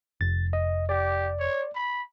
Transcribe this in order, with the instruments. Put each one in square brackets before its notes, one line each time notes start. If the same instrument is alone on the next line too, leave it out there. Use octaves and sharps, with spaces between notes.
[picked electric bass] F1 [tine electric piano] A6
[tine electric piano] D#5
[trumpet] G4 [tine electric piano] D5
[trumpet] C#5
B5